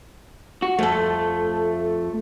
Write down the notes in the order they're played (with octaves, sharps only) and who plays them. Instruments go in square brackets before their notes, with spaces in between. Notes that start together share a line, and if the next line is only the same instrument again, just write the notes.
[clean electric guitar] F#4
[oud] F2 A4 [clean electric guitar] A3